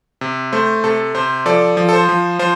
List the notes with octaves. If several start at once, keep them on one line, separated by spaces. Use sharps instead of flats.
C3
A3 C5
C3 A4
C3 C5
F3 A4 D5
F3
A4
C5
F3
F3 C5